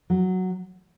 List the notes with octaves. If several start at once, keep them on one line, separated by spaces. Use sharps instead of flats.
F#3